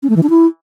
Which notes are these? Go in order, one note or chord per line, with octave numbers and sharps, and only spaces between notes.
C#4
A3
E3
D4
E4